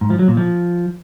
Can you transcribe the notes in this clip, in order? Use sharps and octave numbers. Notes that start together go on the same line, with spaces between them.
G#2
F3
F#3
A#2
F3